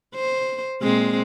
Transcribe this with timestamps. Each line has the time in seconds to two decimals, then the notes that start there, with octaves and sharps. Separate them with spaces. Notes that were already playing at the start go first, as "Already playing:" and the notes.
0.15 C5
0.82 A#2 G#3 C4